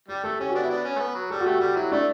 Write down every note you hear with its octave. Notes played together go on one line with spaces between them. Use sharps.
G3 G4
A3 A4
C#4 G4
F#4
B3 D4
E4
B3 D4
C#4
A3
B3
F#3
G3 A4
F#4
A3 G4
G3 G4
F#3 E4
A3 D4